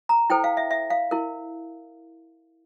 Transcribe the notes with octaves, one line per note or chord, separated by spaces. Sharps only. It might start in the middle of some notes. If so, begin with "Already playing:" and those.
A#5
E4 A4 C5 G5
F5
E5
E5
F5
E4 A#4